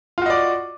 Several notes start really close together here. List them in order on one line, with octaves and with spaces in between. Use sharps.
F4 F#4 D#5 D5